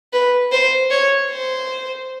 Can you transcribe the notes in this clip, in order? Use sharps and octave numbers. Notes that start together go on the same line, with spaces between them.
B4
C5
C#5
C5